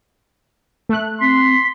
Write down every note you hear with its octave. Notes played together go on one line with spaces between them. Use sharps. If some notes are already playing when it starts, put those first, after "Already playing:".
A3 F#6
C4 C6 B6